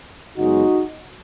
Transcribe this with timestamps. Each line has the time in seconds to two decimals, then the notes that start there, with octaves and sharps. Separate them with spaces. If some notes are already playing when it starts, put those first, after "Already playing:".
0.37 F#2 C#3 G#3 B3 D#4 F#4